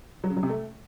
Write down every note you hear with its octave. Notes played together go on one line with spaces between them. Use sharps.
F#3
C#3
F#3
C3
A3